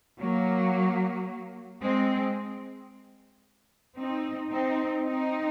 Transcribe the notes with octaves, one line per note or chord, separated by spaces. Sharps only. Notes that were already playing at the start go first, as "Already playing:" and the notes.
F#3 A#3
G#3 C4
C4 D#4
C4 D#4
C4 D#4